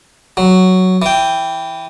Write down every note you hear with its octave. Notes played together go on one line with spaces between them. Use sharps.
F#3
E3 G5